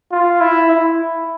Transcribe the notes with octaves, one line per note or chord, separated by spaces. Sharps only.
F4
E4
E4